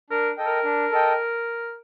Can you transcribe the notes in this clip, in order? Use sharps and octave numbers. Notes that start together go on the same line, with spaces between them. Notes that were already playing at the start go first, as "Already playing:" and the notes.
D4 A#4
A4 D#5 G5
A#4
D4
A4 D#5 G5